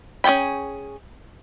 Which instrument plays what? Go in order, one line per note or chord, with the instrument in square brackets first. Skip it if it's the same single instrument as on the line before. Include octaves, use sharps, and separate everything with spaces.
[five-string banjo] C#4 G#4 A4 G5 B5